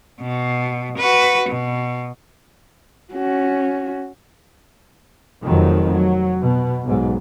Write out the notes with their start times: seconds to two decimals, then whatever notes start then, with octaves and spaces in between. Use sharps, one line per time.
0.21 B2
0.97 F#4 B4
1.49 B2
3.13 C#4 F#4
5.45 F1 F2 D#3 F#3
5.91 F#3
6.42 B2
6.84 B1 G#2